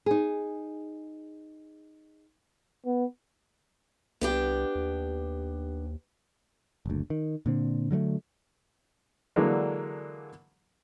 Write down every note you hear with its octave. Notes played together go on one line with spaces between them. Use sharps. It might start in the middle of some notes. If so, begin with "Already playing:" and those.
D#4 G#4
B3
C2 B3 D4 G4
D#2
F#1 D2
D#3
A#2 D3 C4
D3 F#3 G3 A3
D3 E3 F#3 G#3 A#3 D4